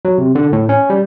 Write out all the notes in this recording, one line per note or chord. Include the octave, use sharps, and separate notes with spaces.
F#3
C3
D3
A2
C#4
G3